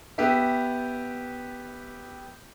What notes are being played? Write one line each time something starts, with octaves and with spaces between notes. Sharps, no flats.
B3 G4 E5